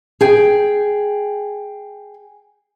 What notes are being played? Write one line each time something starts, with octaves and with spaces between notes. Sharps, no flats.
G#4 G5